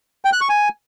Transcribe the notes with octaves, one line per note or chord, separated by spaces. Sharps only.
G5
F#6
C#6
G#5